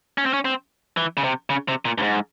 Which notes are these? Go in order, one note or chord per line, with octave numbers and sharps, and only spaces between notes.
C#4
C4
C#4
C4
E3
C#3
C3
C#3
C3
A#2
G2
G#2